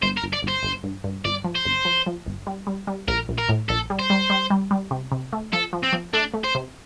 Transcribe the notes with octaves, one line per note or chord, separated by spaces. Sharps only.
G1 C5
A#4
G1
D5
G1
C5
G1
G2
G2
G1 D5
F3
C5
G1
F3
F3
G1
G3
G3
G3
A#1 A#4
A#1
A#4
A2
A#1 A4
G3
C5
G3
G3
G3
G3
C3
C3
A3
F3 A4
F3
C4
F3
A3 D4
A3
C5
C3